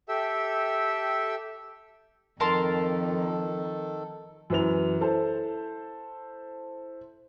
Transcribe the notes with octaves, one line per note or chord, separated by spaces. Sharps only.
G4 A4 E5 G5 E6
F2 D#3 A4 A#4 A5 C6
F#2 E3 B4 F7
E4 A4 C5 A5